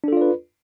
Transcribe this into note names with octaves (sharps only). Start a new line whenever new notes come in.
D4 F4 A4 B4 D5